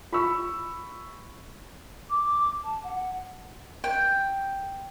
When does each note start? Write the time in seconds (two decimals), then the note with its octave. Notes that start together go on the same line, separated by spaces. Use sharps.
0.13 F4 B5 C#6 E6
2.09 D6
2.63 A5
2.83 F#5
3.84 G5